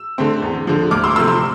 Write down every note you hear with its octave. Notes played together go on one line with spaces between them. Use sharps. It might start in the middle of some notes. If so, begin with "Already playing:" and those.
Already playing: E6
D3 A3 C4
E2
D3 F3
D2 D6 F6
C6 E6
C3 F3 A3 C6 E6
C6 E6